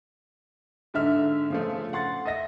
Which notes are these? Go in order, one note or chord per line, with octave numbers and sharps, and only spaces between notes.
G#2 D3 E5 F6
C#3 F3 A3
F#5 C6 A6
D#5 E5 A#6